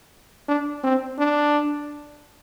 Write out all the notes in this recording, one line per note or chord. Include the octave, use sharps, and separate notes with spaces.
D4
C4
D4